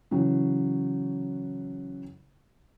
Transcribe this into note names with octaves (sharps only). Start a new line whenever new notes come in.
C#3 E3 F#3